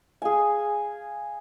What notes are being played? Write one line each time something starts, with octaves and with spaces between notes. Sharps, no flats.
G#4 F5 G#5